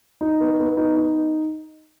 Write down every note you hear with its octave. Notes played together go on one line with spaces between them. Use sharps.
D#4
B3
B3
D#4
D#4